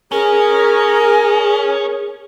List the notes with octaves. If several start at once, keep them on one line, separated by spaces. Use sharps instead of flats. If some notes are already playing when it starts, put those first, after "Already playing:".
C#4 G#4 A#4